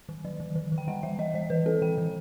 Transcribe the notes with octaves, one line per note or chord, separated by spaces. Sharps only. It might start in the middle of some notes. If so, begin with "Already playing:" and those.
D#3
F#3
D#3
D#3
D#3
G5
G3 F#5
E3 E5
E3 D#5
E3 D#5
E3 B4
C4 A4
E3 G5
E3